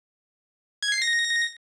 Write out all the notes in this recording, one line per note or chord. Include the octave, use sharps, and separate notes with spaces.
G#6
C7
A#6